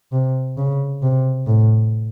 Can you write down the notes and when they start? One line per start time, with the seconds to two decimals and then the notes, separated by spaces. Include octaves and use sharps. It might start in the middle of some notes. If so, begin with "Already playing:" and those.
0.12 C3
0.57 C#3
1.02 C3
1.47 A2